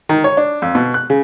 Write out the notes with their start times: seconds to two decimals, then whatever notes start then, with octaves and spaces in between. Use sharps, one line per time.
0.09 D#3
0.24 C#5
0.37 D4
0.62 F2
0.75 B2
0.94 F#6
1.10 C#3